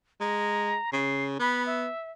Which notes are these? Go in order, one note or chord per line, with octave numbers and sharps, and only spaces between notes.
G#3 A#5
C#3 C7
B3 B5
E5